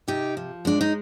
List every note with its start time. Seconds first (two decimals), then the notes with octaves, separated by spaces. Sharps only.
0.08 C3 D#4 G4
0.37 F3
0.65 G#3 D4
0.81 D#4